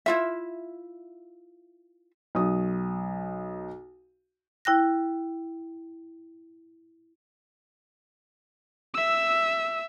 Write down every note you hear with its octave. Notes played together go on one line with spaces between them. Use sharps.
E4 F4 E5
B1 D#6
E4 G5 F#6 A#6
E5 E6